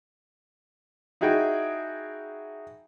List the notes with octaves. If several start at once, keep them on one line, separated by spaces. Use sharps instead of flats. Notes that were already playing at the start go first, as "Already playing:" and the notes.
D#4 E4 F#4 G#4 G5